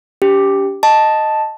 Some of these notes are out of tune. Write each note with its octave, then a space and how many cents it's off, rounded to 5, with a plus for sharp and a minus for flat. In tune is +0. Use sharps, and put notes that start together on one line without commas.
C#4 +45 G4 +0
D#5 +0 A5 +0